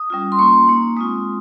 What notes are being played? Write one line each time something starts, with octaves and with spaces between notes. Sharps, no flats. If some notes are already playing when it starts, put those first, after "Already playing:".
Already playing: D#6
G3 C#4 F4
C6
A#3 C#4 F4 C#6
A#3 D#4
G#3 C4 F4 D#6